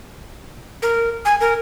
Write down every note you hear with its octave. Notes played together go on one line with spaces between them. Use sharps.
A#4
G#5
A#4